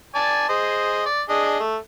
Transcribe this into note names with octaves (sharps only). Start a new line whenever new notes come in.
D5 G#5 A5
G#4 C5 D#5
D5
D4 G#4 D#5
A3